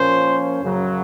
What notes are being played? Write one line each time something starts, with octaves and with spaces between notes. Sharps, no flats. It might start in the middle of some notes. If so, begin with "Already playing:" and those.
Already playing: A#2 F3 A#3 C#4 C5
F#2 C#3 F#3